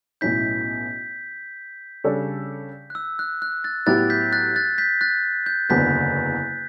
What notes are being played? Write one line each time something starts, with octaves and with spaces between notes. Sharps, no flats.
B1 A2 F#3 C#4 E4 G6 B6
C#3 G3 D4 A4 C#5
F#6
E6
F#6
F#6
F#6 A6
A2 F#3 B3 E4 G4 F#6 A6
G6 B6
F#6 A6
F#6 A6
G6 B6
F#6 A6
G6
F#1 E2 D3 F#3 B3 G6 B6